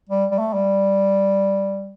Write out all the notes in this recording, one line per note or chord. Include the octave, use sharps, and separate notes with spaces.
G3
G3
A3
G3